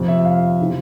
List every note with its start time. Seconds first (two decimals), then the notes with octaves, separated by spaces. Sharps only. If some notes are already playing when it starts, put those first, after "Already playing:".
Already playing: F2 C3 F3
0.08 E5
0.25 F5
0.61 C3 E3